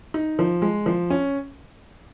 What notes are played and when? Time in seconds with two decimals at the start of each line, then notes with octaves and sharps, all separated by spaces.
0.14 D#4
0.39 F3
0.62 G#3
0.86 F3
1.10 C#4